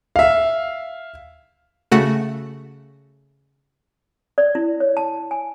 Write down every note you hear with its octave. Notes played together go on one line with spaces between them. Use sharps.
E5 F5
C#3 A3 F#4
D5
E4
C#5
A5
G#5